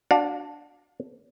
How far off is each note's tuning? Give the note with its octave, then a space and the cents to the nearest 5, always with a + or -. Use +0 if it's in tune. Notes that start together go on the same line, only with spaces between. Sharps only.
D4 +0 F#4 +0 F5 +35